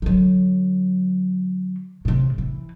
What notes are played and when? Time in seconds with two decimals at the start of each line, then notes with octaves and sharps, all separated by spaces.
0.02 D3 F#3
2.05 A2 C3
2.38 E3